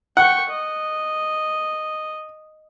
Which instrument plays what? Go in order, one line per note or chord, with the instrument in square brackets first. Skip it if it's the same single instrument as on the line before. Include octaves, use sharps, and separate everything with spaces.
[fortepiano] F#5 [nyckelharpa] G5 C#6
[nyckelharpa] D#5